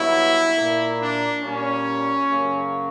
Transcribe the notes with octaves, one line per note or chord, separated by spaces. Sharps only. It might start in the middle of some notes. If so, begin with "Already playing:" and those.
Already playing: G2 F#3 B3 E4
A#2 A#3
D4
A#2 G3 A#3 C#4
F#2 C#3 F#3 A#3